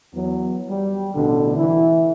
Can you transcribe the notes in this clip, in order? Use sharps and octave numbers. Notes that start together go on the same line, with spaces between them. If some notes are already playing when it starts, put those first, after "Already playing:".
E2 F#3
G3
A1 B2 D3
E3 E4